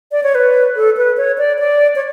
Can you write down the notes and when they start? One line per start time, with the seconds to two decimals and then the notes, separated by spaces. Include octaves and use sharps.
0.12 D5
0.23 C#5
0.35 B4
0.76 A4
0.97 B4
1.17 C#5
1.38 D5
1.59 D5
1.96 C#5